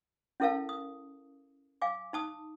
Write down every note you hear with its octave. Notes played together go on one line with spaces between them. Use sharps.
C#4 E4 A4 A#4 F5 A5
D#6
F5 G#5 D6
D#4 A5 D#6